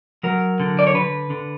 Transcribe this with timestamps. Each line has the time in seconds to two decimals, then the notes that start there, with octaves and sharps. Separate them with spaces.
0.23 F#3 A#4
0.60 D3
0.79 D5
0.87 C#5
0.94 D3 B4
1.30 D3